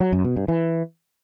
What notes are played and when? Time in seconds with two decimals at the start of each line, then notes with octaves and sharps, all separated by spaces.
0.01 F#3
0.12 F#2
0.24 B2
0.36 G2
0.48 E3